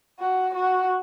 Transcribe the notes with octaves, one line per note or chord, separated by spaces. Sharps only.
F#4
F#4